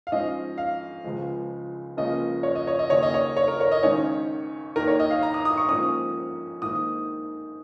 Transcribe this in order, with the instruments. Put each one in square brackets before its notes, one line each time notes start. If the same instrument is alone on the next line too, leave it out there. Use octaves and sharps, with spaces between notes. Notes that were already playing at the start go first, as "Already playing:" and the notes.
[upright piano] F5
G#2 F3 C#4 D#5
F5
C#2 C#3 F3 G#3
C#2 C#3 F3 A#3 C#4 D#5
C#5
D#5
C#5
D#5
D#2 C#3 A#3 C#4 C#5
D#5
C#5
C#5
A#4
C#5
D#5
G#1 G#2 D#3 C#4 C#5
D#2 D#3 A#3 A#4
C#5
D#5
F5
A#5
D#6
D#6
C#6
G#2 F3 A#3 C#4 D#6
G#2 D#3 A#3 D#6